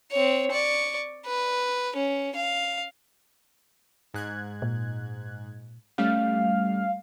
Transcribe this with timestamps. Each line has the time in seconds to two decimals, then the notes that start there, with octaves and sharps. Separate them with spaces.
0.11 C4 C#5
0.51 D5 C#6
1.26 B4
1.96 C#4
2.35 F5
4.14 G#2 F#6 G#6
4.62 A#2
5.98 G3 A3 C#4 F5